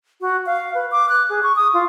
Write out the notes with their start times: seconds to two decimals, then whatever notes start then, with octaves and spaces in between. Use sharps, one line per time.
0.21 F#4
0.46 F5
0.75 B4
0.91 D6
1.09 F#6
1.30 G#4
1.43 C#6
1.56 D#6
1.74 F4